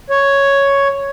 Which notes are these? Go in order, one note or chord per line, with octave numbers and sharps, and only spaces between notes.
C#5